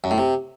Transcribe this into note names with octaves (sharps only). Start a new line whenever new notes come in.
F#2
A2
C3